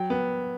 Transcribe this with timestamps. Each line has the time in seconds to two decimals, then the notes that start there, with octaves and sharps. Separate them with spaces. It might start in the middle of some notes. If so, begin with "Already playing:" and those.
Already playing: F#3 G5
0.10 B3